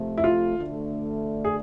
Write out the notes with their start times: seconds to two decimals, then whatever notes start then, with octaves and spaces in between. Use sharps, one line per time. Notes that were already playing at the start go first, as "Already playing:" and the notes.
Already playing: C3 F3 A3
0.18 E4
0.24 F4
0.55 D2 D3 A3 D4
1.45 G#4